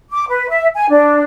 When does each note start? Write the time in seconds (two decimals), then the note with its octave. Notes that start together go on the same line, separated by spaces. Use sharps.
0.11 D6
0.29 B4
0.49 E5
0.75 G#5
0.90 D4